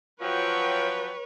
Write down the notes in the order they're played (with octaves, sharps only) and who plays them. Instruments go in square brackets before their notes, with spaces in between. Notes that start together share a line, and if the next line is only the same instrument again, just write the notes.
[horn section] F3 F#3 G5 [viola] B4 C#5